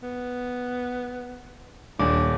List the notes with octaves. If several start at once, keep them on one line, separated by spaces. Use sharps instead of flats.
B3
D#1 D4 C#5 G#5 D6